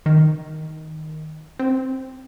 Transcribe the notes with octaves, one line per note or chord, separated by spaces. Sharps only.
D#3
C4